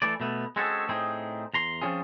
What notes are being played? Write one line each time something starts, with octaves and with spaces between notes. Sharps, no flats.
E3 A3 D5
B2 A3 B3
G#3 C4 C#4 F#4 G#4 A4
A2 C4 D#4 G#4
E2 A#5 C6
F3 C4 C#4 F4 G#4